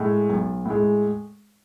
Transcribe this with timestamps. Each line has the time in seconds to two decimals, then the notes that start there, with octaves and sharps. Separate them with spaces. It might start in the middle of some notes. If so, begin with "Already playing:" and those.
Already playing: A2 G#3
0.30 B1
0.65 A2 G#3